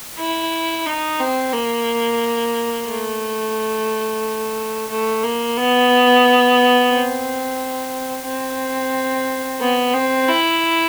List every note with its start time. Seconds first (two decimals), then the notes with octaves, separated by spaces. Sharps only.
0.18 E4
0.86 D#4
1.20 C4
1.53 A#3
2.88 A3
4.90 A3
5.24 A#3
5.57 B3
6.91 C4
8.26 C4
9.61 B3
9.94 C4
10.28 E4